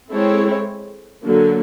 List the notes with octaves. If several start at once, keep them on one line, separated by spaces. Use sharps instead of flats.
G#3 C4 E4 A4 C#5
D3 F#3 A#3